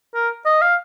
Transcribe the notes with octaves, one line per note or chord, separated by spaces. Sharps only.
A#4
D#5
F5